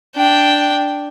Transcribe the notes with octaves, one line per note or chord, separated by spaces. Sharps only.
D4 G5